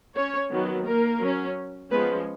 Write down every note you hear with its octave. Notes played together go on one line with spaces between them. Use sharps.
C#4 C#5
D#3 F#3 B3
A#3 A#4
F#3 C#4
F3 G#3 B3 C#4 B4